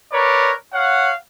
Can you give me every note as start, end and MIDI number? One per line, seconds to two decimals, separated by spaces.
0.12 0.52 70
0.12 0.52 71
0.12 0.52 73
0.12 0.52 74
0.73 1.12 73
0.73 1.12 77
0.73 1.12 78